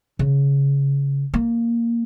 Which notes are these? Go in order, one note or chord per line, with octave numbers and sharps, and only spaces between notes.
C#3
A#3